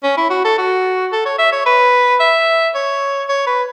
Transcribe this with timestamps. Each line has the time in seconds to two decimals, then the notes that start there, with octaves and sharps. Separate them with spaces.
0.04 C#4
0.17 E4
0.30 F#4
0.45 A4
0.58 F#4
1.12 A4
1.26 C#5
1.39 E5
1.52 C#5
1.66 B4
2.20 E5
2.75 C#5
3.29 C#5
3.47 B4